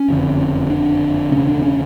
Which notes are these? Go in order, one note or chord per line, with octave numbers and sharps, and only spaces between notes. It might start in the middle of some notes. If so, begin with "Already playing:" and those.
Already playing: C#4
F#1 F2 D3
D4
E1 D2 C#3 C#4
D4
C#4